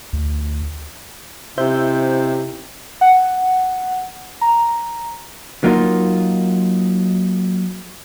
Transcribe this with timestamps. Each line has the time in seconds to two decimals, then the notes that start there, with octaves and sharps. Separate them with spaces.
0.13 D2
1.58 C3 C#4 D#4 E4 C5 E5 G6
3.01 F#5
4.41 A#5
5.64 F#3 A#3 D#4 F4